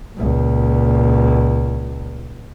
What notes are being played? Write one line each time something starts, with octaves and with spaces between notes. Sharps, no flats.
C#2 A#2